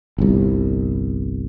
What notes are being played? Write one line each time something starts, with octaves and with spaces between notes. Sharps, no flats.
G1 C2